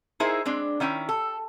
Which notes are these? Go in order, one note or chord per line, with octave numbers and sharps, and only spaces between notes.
D#4 E4 G#4 A#4 C5 E5
G#3 C4 D4
D#3 C#4 E4 G5
A4